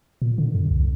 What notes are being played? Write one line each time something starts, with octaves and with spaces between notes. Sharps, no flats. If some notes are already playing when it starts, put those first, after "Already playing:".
A#2
D3
F#2
C2